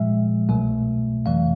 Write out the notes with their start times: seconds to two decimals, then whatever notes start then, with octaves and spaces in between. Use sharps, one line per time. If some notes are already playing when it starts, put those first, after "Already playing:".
Already playing: A#2 F3 G#3 E5
0.49 C2 B2 F#3 A3
1.26 F2 C3 E3 A3 F5